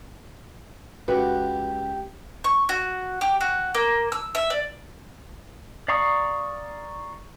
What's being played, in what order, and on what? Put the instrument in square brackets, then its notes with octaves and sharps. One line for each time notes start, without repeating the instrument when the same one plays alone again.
[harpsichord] C#2 [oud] F#4 [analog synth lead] G4 [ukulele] B4
[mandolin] C#6
F#4
G4
F#4
A#3
E6
E5
D5
[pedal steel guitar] D5 F5 A#5 C#6 D#6